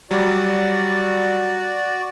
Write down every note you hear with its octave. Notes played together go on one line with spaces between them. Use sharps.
F#3 G3 F#4 D5